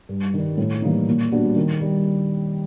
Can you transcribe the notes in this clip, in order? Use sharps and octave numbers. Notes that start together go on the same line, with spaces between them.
G2
D#3 G3
A2
E3 G3 A#3 D#4
A#2
G3 B3 D4 F#4
D#3
G3